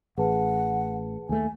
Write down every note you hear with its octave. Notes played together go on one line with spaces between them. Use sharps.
A1 G#4 B4 F#5 A5
D#2 A3 G#5